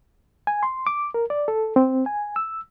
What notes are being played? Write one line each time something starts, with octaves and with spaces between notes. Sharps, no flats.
G#5
C6
D6
A#4
D5
A4
C4
G#5
E6